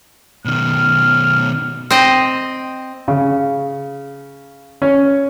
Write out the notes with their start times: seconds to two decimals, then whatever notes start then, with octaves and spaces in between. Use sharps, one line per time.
0.45 B2 D#3 F6
1.91 C4 D#5
3.08 C#3
4.82 C#4